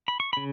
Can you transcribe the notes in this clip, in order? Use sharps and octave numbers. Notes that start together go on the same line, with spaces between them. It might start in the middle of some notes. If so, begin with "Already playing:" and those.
B5
C#6
C#3 B5